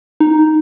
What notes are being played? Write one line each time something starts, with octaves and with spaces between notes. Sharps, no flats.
D#4